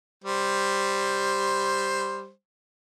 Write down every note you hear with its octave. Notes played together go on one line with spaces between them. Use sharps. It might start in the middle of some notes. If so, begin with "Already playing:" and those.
G3 C5